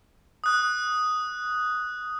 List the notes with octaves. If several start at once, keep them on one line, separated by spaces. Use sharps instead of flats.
D#6 F#6